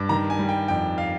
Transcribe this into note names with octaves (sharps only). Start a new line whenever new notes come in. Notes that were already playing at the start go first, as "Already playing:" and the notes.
Already playing: G2
D#3 A#5
G#5
G3
G5
F2 G5
F5